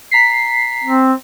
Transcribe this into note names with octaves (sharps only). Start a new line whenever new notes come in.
A#5 B6 C7
C4